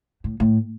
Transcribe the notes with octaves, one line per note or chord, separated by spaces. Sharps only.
A2
A2